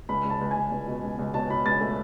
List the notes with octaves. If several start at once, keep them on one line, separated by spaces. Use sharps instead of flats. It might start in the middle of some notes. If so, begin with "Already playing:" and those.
C#2 B5
C#2 A5
C#2
G#5
C#2
C#2
B2
C#2
C#2
B2 A5
B2 B5
C#2 A6
A3